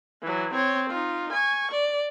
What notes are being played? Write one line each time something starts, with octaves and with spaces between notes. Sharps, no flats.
E3 F#3
C4 C#5
D#4 F4
G#5 C#6
D5